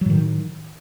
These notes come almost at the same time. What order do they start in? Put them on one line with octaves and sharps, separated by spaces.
F#3 A2 D#3